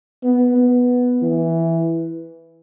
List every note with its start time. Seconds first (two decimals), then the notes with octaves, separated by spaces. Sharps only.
0.24 B3
0.57 B3
1.23 E3